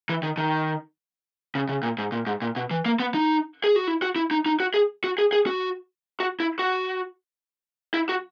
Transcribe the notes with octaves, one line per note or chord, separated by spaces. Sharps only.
E3
D#3
D#3
C#3
C#3
A#2
G#2
A#2
G#2
A#2
B2
E3
A#3
B3
D#4
G#4
F#4
E4
F#4
E4
D#4
D#4
F#4
G#4
F#4
G#4
G#4
F#4
F#4
E4
F#4
E4
F#4